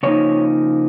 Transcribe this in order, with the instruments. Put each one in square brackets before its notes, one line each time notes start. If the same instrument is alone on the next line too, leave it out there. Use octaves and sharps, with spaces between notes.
[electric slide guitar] C#3 F3 A#3 D#4 C#5